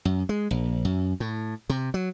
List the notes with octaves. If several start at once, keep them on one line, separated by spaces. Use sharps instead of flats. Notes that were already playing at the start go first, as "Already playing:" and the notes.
F#2
G#3
A#1
F#2
A2
C3
F#3